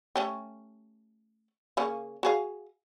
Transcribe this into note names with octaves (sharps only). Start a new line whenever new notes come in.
A3 C#4 G4
C#3 A#3 C#4
F#4 G#4 F5